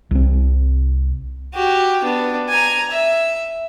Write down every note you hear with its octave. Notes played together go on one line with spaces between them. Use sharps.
C2 C4
F#4 G4
B3 D4
G#5 A#5
E5